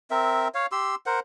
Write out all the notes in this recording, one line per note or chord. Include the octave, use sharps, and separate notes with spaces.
C4 A#4 E5
C#5 F5
G4 C6 E6
A#4 C5 F#5